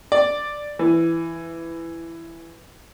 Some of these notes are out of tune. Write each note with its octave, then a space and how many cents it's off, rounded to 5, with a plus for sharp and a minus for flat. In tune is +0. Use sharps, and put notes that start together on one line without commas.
D5 +5
E3 +10